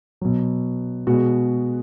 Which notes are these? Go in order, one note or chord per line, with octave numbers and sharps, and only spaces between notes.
B2 F#3
B2 G#3 F#4